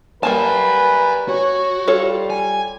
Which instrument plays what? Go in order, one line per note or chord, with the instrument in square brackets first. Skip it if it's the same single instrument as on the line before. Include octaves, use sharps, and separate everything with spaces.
[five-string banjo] G3 A#3 A5 [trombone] B4 [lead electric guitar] F#5 G#5
[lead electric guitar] F#4 [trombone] C#5
[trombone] G3 [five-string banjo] F4 A4 C#5
[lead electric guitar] G#5